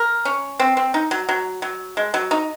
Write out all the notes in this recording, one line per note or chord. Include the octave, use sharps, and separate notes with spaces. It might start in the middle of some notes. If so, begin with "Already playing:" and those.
Already playing: A#4
C#4
C4
C4
D#4
F#3
F#3
F#3
G#3
F#3
D#4